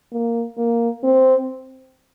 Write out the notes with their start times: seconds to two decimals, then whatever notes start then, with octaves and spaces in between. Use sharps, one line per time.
0.12 A#3
0.57 A#3
1.04 C4